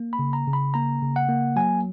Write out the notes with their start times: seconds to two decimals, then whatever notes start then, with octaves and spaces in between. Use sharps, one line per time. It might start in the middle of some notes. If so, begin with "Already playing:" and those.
Already playing: A#3
0.13 B5
0.19 C#3
0.33 A#5
0.47 C#3
0.53 B5
0.74 A#3 A#5
1.02 C#3
1.16 F#5
1.29 A#3
1.56 F#3 G#5